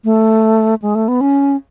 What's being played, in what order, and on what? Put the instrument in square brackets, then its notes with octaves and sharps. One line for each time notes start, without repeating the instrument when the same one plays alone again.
[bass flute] A3
G#3
A3
B3
C#4